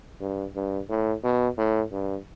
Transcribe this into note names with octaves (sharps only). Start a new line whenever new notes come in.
G2
G2
A2
B2
A2
G2